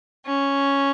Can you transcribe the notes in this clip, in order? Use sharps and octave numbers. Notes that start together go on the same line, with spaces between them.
C#4